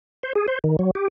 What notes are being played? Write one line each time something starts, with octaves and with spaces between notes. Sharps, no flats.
C5
G#4
C5
D#3
F#3
G4